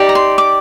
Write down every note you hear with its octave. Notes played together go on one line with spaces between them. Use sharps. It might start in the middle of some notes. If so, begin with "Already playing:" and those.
Already playing: D#4 G4 D5
A#5
C6
D6